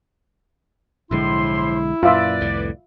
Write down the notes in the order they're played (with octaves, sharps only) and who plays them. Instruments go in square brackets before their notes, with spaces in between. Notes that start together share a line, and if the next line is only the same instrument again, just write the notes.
[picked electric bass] B1 D3 G#3 [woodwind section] A2 F3 C6 [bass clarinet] E4
[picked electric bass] F#2 A#2 [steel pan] F4 E5 [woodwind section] B4 D5
[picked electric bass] C2 F2 A2